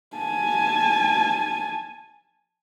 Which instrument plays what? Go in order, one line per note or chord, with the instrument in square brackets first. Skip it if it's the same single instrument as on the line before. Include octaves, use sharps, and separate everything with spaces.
[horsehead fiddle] G#5 A5